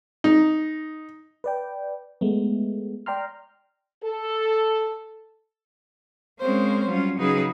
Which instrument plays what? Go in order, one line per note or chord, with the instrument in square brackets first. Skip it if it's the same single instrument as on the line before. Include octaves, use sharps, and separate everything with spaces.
[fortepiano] D#4
[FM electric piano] B4 D5 G5
G#3 A3 B3
D5 G5 A#5 C6 F6
[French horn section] A4
[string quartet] G#3 A#3 C4 C#4 C5 C#5
F#3 G3 C#4 F4
C#3 F#3 D#4 G#4 B4